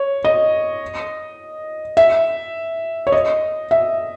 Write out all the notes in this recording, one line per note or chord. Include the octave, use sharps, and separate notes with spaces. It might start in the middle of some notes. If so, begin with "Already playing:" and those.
Already playing: C#5
D#5
E5
C#5
D#5
E5